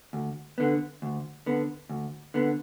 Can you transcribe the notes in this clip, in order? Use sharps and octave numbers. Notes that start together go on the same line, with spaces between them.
D2
D3 B3
D2
D3 B3
D2
D3 B3